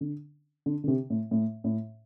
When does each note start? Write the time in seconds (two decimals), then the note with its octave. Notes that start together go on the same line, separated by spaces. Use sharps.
0.01 D3
0.66 D3
0.84 D3
0.88 C3
1.10 A2
1.31 A2
1.64 A2